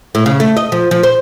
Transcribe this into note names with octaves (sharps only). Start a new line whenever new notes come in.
A2
C#3
A3
D#5
F3
F3
C5